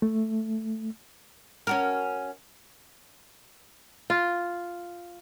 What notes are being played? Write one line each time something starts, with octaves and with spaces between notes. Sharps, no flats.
A3
C#4 F#4 A#4
F4